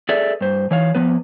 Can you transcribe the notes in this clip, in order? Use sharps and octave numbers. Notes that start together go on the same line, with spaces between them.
G#4 A4 B4 D5 E5
G2 C5
E3 C#5 F5
F2 F3 B3 B4